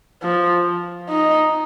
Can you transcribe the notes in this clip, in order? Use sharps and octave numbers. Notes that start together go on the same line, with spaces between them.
F3
D#4